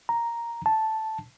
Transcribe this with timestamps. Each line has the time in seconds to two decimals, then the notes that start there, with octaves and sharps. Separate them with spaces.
0.09 A#5
0.66 A5